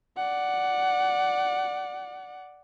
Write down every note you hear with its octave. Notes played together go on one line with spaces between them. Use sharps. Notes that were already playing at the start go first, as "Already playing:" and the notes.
D5 F#5